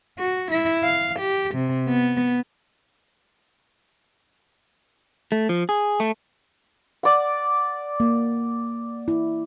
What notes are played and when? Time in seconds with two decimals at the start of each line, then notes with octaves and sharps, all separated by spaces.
0.19 F#4
0.51 E4
0.84 F5
1.20 G4
1.55 C3
1.88 B3
5.32 A3
5.49 F3
5.69 G#4
6.00 A3
7.03 D5 F#5
8.00 A#3
9.08 E4